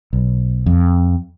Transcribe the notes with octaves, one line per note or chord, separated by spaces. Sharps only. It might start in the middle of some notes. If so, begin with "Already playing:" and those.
B1
F2